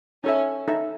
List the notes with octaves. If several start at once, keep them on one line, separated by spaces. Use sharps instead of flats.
C#4 D#4 A4 E5
D#4 A4 E5